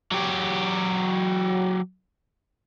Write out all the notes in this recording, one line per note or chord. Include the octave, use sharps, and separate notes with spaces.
F#3 G4